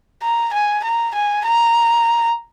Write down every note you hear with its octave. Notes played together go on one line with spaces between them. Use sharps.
A#5
G#5
A#5
G#5
A#5